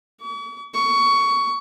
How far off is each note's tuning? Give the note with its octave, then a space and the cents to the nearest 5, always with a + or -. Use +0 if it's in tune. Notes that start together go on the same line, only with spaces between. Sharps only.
C#6 +45
C#6 +15